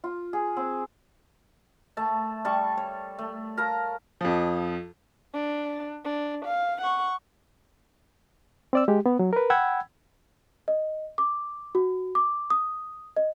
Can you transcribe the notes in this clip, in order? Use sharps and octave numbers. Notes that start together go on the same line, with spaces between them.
F4
G#4
C4
A3 E5 A5
G3 A5 C#6
C#5
A3
A#4 F5 A5 A#5
F2 F3
D4
D4
F5
F#5 C#6
C4 D5 E6
G#3 G4
B3
F#3
A#4 B4
F#5 G5 B5 E6 G#6
D#5
D6
F#4
D6
D#6
D#5